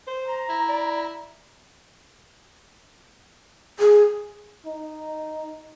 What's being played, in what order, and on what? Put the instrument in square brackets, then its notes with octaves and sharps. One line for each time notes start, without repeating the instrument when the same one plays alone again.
[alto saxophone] C5
[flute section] A#5
[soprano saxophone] E4
[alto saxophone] D5
[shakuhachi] G#4
[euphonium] D#4